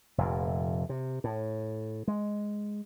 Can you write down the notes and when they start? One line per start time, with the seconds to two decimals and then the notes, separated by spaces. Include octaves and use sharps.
0.18 F1 F2 A#2
0.89 C3
1.24 A2
2.08 G#3